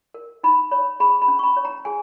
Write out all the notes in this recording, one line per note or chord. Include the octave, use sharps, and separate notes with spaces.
A#4
D#4 B5
C#5 B5
G#4 B5
B5
C#4
C#6
B5
C#5
A#5
G#4 G#5